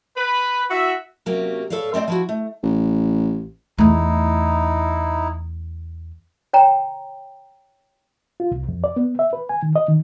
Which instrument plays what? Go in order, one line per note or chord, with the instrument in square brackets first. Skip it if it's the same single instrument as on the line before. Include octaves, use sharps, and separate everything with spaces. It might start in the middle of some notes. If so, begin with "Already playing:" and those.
[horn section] B4
E4 F#4 E5
[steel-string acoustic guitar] C3 F#3 A#3 C#4 G4
A4 B4 C#5 D5 F5
A3 C4 D5 D#5
F3 E4 F#4
A3
[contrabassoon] A1
[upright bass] E2 A3 [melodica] D#4 E4
[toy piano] C#5 G5 A#5
[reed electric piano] F4
C2
F2
D5
B3
E5
B4
G#5
D#3
D#5
D#3